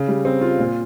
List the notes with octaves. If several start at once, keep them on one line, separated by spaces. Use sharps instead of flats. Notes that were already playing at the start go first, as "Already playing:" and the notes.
Already playing: C#3
G3
C4
F4
A#2